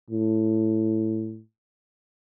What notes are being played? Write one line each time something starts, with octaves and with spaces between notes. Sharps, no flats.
A2